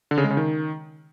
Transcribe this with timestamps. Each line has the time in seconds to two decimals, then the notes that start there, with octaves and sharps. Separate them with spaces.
0.11 D3
0.17 C#3
0.24 G#3
0.31 C#3
0.37 D#3